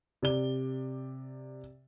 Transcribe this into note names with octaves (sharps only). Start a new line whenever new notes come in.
C3 D5 G7